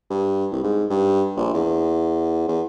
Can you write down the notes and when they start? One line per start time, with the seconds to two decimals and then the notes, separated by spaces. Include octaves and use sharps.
0.10 G2
0.52 C2
0.64 G#2
0.90 G2
1.37 A#1
1.54 E2
2.48 E2